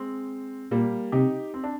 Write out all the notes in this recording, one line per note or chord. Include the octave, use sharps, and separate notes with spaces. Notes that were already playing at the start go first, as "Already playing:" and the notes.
Already playing: G#3 C4
A#2 G3 A#3
C3 D#4 G4
C4
D4